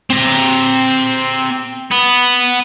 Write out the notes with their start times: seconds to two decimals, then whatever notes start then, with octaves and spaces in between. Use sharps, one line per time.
0.10 C4 A#5
1.91 B3